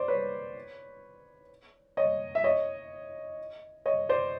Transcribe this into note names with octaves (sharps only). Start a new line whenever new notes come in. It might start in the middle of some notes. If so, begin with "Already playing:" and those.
Already playing: C5 D5
B4 C#5
C#5 D#5
E5
C#5 D#5
C#5 D#5
C5 D5